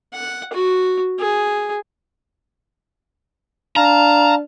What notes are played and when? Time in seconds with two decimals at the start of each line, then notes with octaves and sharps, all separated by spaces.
0.13 F#5
0.53 F#4
1.19 G#4
3.76 D4 F5 A5 A#5